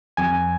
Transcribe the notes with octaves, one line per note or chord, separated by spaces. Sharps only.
F2 G#5